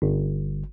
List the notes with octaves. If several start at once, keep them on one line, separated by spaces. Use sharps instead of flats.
G1